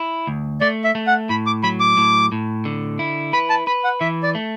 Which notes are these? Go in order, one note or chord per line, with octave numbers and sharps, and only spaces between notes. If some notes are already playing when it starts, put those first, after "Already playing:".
Already playing: E4
D2
A3 D5
E5
A3
F#5
A2 B5
D6
F#3 B5
D6
A2
A2
D3
E4
B4 B5
A5
B4 B5
F#5
E3 E5
D5
A3